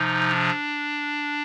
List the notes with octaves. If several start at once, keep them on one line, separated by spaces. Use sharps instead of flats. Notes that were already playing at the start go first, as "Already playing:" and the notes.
Already playing: C3 F3 D#4
D4